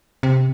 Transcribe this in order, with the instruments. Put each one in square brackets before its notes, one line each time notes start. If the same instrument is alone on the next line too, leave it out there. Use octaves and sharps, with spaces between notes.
[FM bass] C3